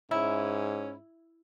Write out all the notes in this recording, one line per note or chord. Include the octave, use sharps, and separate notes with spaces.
G#2 C#4 E4